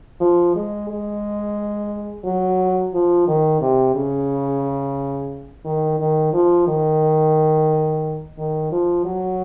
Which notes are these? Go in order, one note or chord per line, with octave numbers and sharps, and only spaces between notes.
F3
G#3
G#3
F#3
F3
D#3
C3
C#3
D#3
D#3
F3
D#3
D#3
F3
F#3